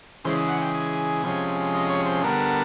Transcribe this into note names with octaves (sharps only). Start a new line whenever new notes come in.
C#3 E3 G#3 C5
F#5
G5
G#5
C3 F3 G#3 C#4
D#5
C#5
C5
D3 G3 B3 D4 A#4